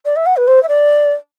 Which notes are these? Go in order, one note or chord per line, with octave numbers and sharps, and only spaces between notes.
D5
E5
F#5
B4
C5
E5
D5